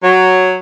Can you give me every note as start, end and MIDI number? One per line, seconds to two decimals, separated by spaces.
0.02 0.56 54